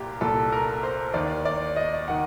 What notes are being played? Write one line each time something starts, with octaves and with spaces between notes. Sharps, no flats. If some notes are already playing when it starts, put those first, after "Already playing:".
Already playing: C2 A#2 G4
C2 A#2 A4
A#4
C5
D#2 D#3 D5
D5
D#5
D#3 F#5